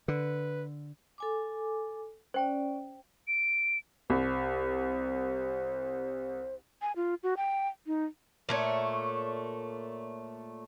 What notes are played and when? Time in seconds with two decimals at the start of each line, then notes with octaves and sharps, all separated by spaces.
0.08 D3 B4
1.18 A4 G#5 D6
2.34 C#4 C5 D5 G5
3.28 D7
4.10 C2 C5
6.82 G#5
6.96 F4
7.23 F#4
7.37 G5
7.87 D#4
8.49 A#2 A3 C#5